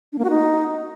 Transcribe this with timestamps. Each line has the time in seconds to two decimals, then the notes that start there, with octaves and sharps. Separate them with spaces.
0.13 D4
0.18 A#3
0.24 F#4
0.30 D#4